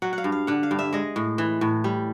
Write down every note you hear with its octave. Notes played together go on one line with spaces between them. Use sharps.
F#3 F#5
F#5
F5
G2
F5
D3 F#5
F5
G2
E5
G#3 D#5
A2
E3
A2
G3